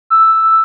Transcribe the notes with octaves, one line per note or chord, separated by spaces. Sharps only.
E6